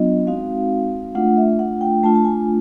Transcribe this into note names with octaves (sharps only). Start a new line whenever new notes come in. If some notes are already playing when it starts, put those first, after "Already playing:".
Already playing: F#3 B3 D4 F4 D#5
G#3 C4 D#4 F#4 F5
A3 D4 F4 F#5
E5
F#5
G5
A3 D4 F4 A5
A5
G#5